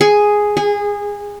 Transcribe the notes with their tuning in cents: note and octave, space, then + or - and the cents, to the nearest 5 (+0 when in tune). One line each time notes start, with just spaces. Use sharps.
G#4 +0
G#4 -20